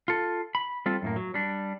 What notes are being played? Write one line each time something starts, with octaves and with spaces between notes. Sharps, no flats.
F4 A4
B5
G3 C4 F4 A4
F#2 A2 A#3
F#3
G3 D4